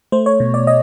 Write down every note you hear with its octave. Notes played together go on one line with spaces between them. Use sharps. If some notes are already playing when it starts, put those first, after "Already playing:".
A3 C5
C#5
B2
D5
D#5